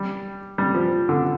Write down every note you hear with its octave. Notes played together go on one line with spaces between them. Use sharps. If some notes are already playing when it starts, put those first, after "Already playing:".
Already playing: G3
G3
F3
D3